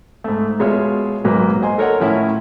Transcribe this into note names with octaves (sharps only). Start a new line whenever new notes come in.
G#2 A3
B2 G#3 F4 C#5 E5 F6
B1 G#2 F#3 A#3 B4
C5 D#5 G#5 C6
A4 A#4 C#5 D#5 F#5
A2 F3 C#4 E4